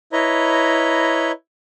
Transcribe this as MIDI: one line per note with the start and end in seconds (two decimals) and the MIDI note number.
0.13 1.32 64
0.13 1.32 71
0.13 1.32 73
0.13 1.32 75
0.13 1.32 82
0.13 1.32 83